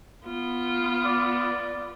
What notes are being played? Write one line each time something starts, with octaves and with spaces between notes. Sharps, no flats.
B3 F4
D5